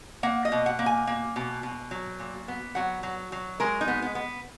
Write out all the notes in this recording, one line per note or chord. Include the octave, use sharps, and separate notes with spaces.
A#3 F#5
D#5
B2
F#5
A#3
G#5
A#3
B2
B2
F#3
A#2
B3
F#3 F#5
F#3
F#3
G#3 A#4
D#4
B3
B3
B3